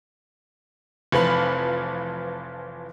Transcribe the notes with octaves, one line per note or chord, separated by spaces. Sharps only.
F1 E3 F3 B5